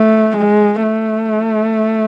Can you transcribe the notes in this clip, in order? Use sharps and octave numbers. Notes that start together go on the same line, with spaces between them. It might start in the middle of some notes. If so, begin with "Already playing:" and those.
Already playing: A3
G#3
A3